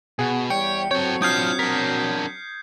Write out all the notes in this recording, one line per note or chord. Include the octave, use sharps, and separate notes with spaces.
B2 G#4 F#5
E2 G3 C#5 G5 C#7
F#3 C4 A4 C#5 G5
D4 F4 D#6 F6 G6 G#6 C7
D4 A#4 B6